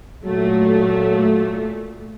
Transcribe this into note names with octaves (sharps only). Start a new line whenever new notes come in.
A#2 F#3 A3